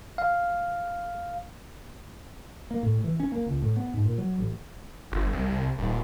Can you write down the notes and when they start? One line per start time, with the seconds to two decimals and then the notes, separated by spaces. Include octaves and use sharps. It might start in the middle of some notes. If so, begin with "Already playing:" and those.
0.18 F5
2.71 A#3
2.83 A2
3.04 E3
3.20 C#4
3.32 A#3
3.46 C#2
3.62 A2
3.76 B3
3.94 G#2
4.05 A#2
4.18 F#3
4.39 A1
5.12 G1
5.33 C2
5.46 C2
5.78 D#1